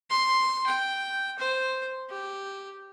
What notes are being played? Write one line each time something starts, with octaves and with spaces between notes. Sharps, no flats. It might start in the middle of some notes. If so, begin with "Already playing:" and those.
C6
G5
C5
G4